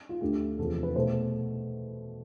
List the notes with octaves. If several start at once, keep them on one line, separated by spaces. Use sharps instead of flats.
F4
D2 D3 A3 G4
E2 C3 F3 A4
B4
B2 A3 C5